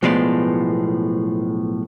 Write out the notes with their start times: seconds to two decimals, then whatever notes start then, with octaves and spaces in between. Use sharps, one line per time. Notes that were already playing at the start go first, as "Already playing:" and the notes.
0.03 B1 A2 F3 G#3 B3 D5